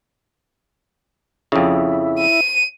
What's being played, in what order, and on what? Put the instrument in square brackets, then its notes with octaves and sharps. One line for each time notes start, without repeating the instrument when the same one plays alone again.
[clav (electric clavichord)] F2 C#3 [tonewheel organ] E4
[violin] D#7